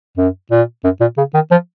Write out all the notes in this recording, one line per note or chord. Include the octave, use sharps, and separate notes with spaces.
F#2
A#2
F#2
A#2
C#3
D#3
F3